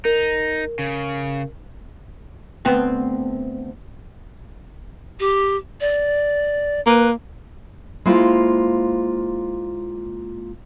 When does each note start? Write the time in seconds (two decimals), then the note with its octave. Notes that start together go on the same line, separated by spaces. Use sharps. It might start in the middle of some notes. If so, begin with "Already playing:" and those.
0.05 D#4 A#4
0.79 C#3
2.65 D2 B3 C4
5.20 G4
5.81 D5
6.86 A#3 B4
8.06 G#3 A#3 E4 F4 C5 F5